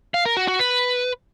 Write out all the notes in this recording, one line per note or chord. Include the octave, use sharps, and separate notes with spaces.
F5
A#4
F#4
F#4
B4